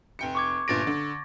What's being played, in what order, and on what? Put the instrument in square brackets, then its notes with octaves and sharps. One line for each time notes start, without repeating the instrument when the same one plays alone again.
[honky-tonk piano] F1 G5 C#7
[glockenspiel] C#6 D6 G#6
[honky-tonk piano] G1 A#2 D7 [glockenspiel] A6 A#6
[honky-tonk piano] D3